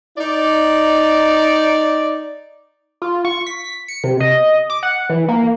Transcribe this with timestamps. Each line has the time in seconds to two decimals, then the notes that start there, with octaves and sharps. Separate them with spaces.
0.17 D#4 D5
3.02 F4
3.25 C#6
3.46 B6
3.88 C#7
4.04 C3
4.20 D#5
4.70 D6
4.83 F#5
5.10 E3
5.29 A#3